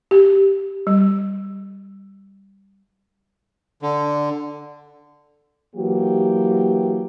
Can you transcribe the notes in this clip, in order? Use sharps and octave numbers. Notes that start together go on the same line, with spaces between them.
G4
G3
D3
E3 F#3 A#3 G4